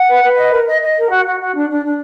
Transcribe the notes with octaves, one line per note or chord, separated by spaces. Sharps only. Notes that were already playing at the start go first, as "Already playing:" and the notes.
Already playing: F#5
B4
B4
D#5
A#4
D#5
D#5
A#4
F#4
F#4
F#4
D4
D4
D4